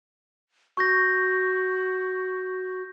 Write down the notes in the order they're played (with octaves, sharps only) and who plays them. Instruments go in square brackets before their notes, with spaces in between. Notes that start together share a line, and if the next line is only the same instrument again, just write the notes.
[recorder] F#4 [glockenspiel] C#6 G6 A#6